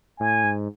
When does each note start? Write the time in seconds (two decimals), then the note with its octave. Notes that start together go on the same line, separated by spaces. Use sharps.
0.20 A2 G#5
0.43 G#2